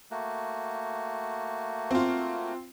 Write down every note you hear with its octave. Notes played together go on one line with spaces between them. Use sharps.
A3 A#3 F#4
C4 F4